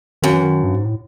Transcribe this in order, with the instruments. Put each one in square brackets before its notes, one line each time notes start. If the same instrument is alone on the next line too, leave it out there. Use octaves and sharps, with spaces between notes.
[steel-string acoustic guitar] F#2 [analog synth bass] D#3
[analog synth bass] E3
D#3
G2
G#2
A2